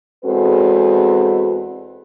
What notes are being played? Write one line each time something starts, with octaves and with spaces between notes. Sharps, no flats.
E2 G#3 C4 F#4 A4 B4